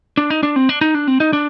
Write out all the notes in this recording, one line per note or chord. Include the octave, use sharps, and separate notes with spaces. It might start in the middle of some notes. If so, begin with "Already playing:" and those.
D4
D#4
D4
C4
D4
D#4
D4
C4
D#4
D4